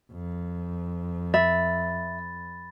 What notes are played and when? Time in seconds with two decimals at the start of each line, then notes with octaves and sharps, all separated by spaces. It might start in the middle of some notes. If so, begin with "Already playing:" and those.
0.12 F2
1.34 E5 B5 A6